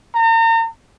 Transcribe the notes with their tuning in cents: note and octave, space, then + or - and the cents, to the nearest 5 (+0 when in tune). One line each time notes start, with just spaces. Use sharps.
A#5 -40